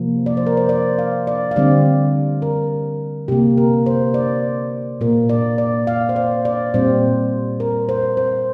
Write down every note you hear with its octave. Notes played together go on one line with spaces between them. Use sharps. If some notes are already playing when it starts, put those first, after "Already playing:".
Already playing: C3 F3 A#3
D5
C5
A#4
C5
D5
F5
D5
F5
D3 G3 C4 D5
A#4
C3 A#3 G4
A#4
C5
D5
A#2 A#3 A#4
D5
D5
F5
C5
D5
D5
A#2 G3 C4 C5
A#4
C5
C5